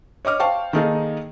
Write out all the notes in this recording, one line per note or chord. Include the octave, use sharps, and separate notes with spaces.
C#5 D#5 D6 F6
C5 F5 G5 A5 C#6
D#3 A#3 D#4 G#4 A4 D#5